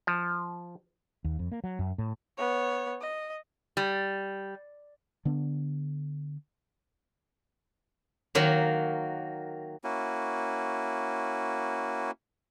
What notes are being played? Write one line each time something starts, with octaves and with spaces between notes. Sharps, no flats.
F3
D#2
F2
A#3
F#3
F#2
A2
B3 C#5
D#5
G3
D3 B3 D4
D#3 F#3 A#3 F#4
A#3 C#4 E4 F#4